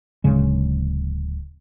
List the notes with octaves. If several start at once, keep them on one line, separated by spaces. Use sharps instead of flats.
D1 C#3 G#3